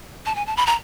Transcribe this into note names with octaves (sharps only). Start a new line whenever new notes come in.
A5
G#5
A5
B5
A#5